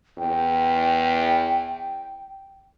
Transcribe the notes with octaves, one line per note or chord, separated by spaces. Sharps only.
E2 G5